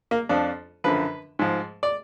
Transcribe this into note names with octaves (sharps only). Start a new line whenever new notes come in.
A#3
F2 F3 D4
F#2 D3 F3 B4
G#2 F3
D5